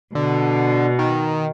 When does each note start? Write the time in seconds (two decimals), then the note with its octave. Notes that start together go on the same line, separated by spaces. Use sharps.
0.15 B2 D3
0.99 D#3